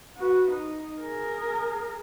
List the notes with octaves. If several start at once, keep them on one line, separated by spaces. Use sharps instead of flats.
F#4 B4
D#4
G#4 A#4